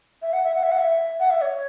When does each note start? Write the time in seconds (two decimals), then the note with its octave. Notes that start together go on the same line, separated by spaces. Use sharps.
0.22 E5
0.32 F#5
0.44 E5
0.55 F#5
0.63 E5
0.71 F#5
0.78 E5
1.19 F#5
1.30 E5
1.41 C#5